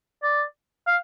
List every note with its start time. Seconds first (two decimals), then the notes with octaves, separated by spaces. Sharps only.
0.23 D5
0.87 F5